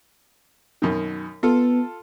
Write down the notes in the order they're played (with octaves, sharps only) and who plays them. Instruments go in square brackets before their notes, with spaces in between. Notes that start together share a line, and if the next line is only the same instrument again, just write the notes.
[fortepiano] F#2 B2 D#3
[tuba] B3 [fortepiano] F4 A4